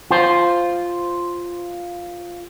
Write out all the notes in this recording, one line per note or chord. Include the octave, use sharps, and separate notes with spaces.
F4 C5